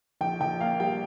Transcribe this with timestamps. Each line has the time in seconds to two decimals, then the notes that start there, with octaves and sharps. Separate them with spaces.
0.21 A#1 G5
0.41 A#1 G5
0.60 A#3 F5
0.80 G3 G5